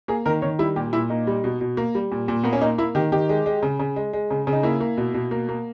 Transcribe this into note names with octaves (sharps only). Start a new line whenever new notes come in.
A#3 G#4
D#3 A#4
D#3 C#5
G3 E4
A#2 G4
A#2 E4
A#3 D#4
G3
B2
B2
A#3
G3
A#2
A#2
A#3 B3
C#4
A#3 D#4
A#3 E4
D#3 G4
D#3 G4
G#3
G#3
C#3
C#3
G#3
G#3
C#3
C#3
D#4
A#3 E4
A#3
B2
B2
A#3
A#3